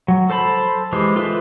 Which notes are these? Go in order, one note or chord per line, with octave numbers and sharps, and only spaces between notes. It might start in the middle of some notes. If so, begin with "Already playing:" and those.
F#3
A4 C5 A5 B5
E3 G#3 G4 C5
F4 A4 B4 C5 E5